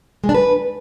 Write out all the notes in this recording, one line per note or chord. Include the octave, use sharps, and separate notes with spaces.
G#3
D4
B4